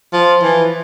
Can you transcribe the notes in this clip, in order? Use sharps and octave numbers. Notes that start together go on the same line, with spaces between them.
F3
E3